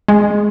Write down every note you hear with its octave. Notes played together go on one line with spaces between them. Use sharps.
G#3